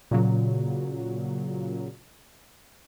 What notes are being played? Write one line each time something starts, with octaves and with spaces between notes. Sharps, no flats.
A#2 C#3 F#3